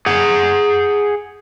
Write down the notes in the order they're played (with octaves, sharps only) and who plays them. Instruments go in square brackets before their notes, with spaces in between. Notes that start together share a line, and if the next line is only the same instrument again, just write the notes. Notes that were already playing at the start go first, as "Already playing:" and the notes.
[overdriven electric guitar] G#4 F#5